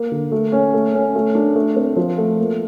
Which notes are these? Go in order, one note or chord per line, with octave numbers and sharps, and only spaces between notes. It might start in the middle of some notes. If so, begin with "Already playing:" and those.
Already playing: A#3
D3
A3
C#4
A3
C#4
A3
D4
A3
C4
F3
A3
A#3